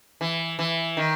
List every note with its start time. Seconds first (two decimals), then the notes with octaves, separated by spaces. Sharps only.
0.21 E3
0.59 E3
0.97 D#3